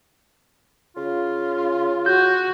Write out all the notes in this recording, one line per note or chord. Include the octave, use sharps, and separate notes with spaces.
C#3 F4
F#4 G6